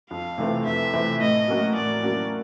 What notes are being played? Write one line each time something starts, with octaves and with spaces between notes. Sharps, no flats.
F2 F5
C3 E3 A3 C4
F2 E5
C3 E3 A3 C4
A2 D#5
F#3 A#3 C#4 F#4
A2 D5
F#3 A#3 C#4 F#4